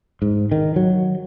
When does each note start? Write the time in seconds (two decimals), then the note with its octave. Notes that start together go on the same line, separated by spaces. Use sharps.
0.22 G#2
0.52 D#3
0.76 F#3